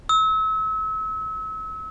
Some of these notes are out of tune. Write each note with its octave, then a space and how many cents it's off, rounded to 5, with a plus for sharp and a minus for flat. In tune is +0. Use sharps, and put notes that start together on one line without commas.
E6 -35